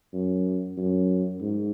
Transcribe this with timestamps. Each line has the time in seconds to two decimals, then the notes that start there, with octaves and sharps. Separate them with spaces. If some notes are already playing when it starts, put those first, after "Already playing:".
0.13 F#2
0.77 F#2
1.41 G#2